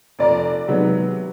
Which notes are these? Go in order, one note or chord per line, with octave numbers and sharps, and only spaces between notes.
F1 D5 A#5
C3 D#3 F#3 G#3 B3